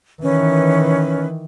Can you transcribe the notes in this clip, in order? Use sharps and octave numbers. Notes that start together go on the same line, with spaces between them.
D#3 E3 C#4 B4